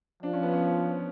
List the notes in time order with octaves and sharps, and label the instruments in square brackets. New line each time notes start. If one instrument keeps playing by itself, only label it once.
[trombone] F3 [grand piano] D4
[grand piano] C#4
B3
C#4